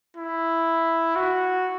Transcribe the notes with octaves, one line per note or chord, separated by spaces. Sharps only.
E4
F#4